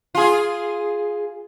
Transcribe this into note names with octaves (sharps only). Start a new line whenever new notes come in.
F4 G#4